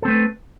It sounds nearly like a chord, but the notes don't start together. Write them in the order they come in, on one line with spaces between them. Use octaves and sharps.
A4 C4 A3 B4